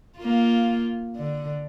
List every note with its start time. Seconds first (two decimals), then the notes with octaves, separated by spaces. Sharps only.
0.19 A#3 F4
1.16 D3